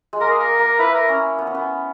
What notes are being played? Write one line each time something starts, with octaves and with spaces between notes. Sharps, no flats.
G#3
A#3 A#4
G#4
A#3 A#4
A#3
E4 B4
A#4
C#4
B3
C#4
B3